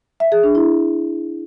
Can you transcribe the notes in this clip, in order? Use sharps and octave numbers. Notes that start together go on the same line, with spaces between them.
E5
G#4
D4
E4